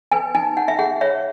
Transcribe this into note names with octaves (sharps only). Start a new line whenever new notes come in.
B4 G#5
D#4 G#5
D#4 F#5
E5
G#4 F#5
C#5 E5